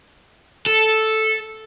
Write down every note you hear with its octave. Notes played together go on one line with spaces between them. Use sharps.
A4